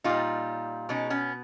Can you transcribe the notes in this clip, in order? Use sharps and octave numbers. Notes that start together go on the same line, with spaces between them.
A#2 G3 D#4 F4
B2 G#3 C#4 D#4
B3 C#4